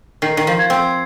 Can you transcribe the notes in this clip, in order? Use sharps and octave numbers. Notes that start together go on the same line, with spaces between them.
D#3 C7
D#3
F3
G#6
C4